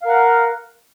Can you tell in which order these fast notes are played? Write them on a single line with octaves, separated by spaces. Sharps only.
F5 A#4 F#5